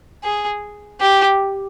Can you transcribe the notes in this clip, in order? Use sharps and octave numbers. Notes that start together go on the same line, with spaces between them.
G#4
G4